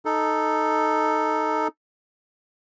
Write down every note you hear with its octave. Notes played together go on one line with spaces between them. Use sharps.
D#4 A4